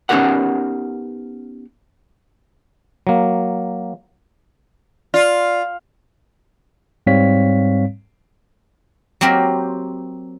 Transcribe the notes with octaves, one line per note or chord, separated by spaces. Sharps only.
B3 C#4 D#4 G4 A#4 F#5
F#3 A#3
F4 D5
G#2 G3 C4 C#5 F5 B6
F#3 A#3 C4 G4 A#4 C5